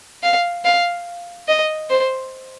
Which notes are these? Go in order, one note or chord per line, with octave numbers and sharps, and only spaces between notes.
F5
F5
D#5
C5